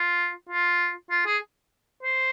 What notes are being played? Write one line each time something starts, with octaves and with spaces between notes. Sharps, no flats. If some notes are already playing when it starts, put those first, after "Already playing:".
Already playing: F4
F4
F4
G#4
C5